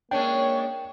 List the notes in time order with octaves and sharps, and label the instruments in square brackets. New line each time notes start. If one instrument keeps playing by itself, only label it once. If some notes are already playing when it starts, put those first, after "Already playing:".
[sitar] G#3 C#4 D4 [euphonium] A#3 [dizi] C#5 [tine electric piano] G5